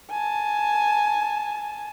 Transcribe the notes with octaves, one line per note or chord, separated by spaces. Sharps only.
G#5 A5